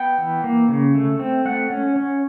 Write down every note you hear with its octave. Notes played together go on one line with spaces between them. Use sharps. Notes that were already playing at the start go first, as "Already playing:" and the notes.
Already playing: B3 G5
E3
A#3
C#3
A3
C4
A3 F#5
C#4
C#4